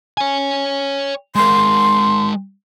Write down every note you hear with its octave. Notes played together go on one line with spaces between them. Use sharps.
C#5 G#5
G#3 A#4 C6